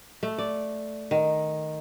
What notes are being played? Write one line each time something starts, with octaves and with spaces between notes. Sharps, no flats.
A3
D5
D#3